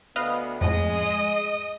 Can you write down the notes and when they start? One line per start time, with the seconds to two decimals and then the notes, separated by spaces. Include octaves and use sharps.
0.16 D2 B3 B4 D#5 F5
0.61 F2 A2 G#3 D#5